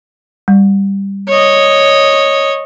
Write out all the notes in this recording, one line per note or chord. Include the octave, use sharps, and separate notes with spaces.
G3
C#5 D#5